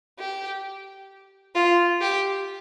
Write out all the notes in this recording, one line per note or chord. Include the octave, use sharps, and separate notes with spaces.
G4
F4
G4